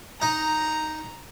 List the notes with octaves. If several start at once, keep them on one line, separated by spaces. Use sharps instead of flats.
D#4 A#5